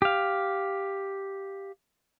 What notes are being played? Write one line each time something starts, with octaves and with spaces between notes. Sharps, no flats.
G4 F5